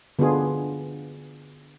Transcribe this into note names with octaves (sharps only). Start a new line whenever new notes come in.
D3 B3 D4 F4 G#4